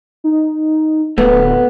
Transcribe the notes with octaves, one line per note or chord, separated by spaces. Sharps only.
D#4
D1 A3 B3 B4